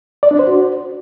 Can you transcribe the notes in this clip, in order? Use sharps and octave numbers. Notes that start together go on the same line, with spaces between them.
D5
D4
C5
F#4